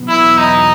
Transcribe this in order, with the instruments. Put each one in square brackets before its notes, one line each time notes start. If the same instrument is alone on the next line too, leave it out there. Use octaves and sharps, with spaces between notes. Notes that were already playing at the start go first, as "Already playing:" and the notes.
Already playing: [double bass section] E2 B2 F#3 B3
[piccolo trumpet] E4
D#4